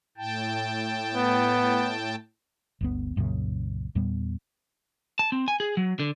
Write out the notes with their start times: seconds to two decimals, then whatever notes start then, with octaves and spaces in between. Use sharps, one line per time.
0.17 A2 G5 A5
1.15 B3
2.81 G1 D2 B3
3.16 C2 F#2 A#2 C#3
3.95 E2 A#2 G3 B3
5.19 A5
5.32 C4
5.48 G#5
5.60 G#4
5.77 F#3
6.00 D3